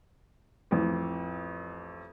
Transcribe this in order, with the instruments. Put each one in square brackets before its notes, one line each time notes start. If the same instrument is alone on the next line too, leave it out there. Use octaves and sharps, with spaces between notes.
[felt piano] A1 F2